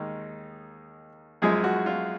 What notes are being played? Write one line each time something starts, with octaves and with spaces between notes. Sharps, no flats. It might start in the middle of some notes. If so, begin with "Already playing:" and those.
Already playing: D#2 D#3 G#3 D#4
F#2 F3 G#3 G#4
F#4
F4